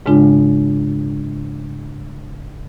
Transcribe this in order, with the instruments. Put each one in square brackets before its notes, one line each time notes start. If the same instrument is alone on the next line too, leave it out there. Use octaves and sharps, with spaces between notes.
[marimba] G#2 C#3 G#3 D4 F4